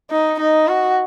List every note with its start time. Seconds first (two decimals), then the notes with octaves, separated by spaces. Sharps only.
0.11 D#4
0.39 D#4
0.68 F#4